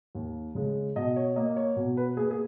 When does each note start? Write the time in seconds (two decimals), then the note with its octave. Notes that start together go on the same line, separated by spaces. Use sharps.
0.15 D#2
0.55 C#3 G#3
0.96 B2 D#5
1.16 C#5
1.36 A#3 D#5
1.56 C#5
1.76 B2
1.97 B4
2.17 A#3 G#4
2.30 G#4